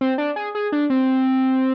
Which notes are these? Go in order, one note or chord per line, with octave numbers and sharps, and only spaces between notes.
C4
D4
G#4
G#4
D4
C4